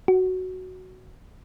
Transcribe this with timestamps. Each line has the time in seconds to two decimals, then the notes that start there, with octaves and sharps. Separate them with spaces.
0.08 F#4